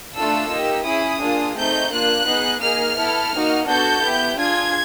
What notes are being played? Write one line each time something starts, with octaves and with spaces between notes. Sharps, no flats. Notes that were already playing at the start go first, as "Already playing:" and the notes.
A3 D4 F4 A4 E6
A#3 D#4 G4
C#4 E4 G#4 D#6
A#3 D4 F4 G#4
A3 C4 D#4 G6
A#3 D4 F4 F#6
B3 D#4 G#4
A#3 D#4 G#4 F6
B3 E4 A4
A#3 D#4 F#4
B3 D4 F#4 A4 G6
B3 E4 G4
D4 F4 G#4 G#6